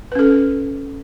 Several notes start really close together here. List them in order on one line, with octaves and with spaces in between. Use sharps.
B4 C#4 A4